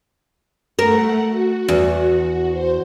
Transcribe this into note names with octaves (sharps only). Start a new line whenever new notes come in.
A3 A#4 F#5
F#4
E2
C5